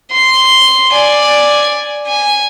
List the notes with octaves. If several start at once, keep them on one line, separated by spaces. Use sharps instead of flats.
C6
D5 G#5
G#5